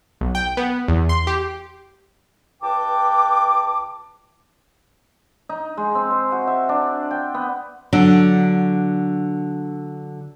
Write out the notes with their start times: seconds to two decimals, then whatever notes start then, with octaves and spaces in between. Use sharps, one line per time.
0.21 B1
0.35 G5
0.57 B3
0.88 E2
1.09 C6
1.27 G4
2.63 C#2 B4 G5 A5 D6
5.49 D#4
5.77 G#3
5.95 C4
6.11 C5
6.32 F#4
6.47 E5
6.69 D4
7.11 G5
7.34 B3
7.93 D3 F#3 D4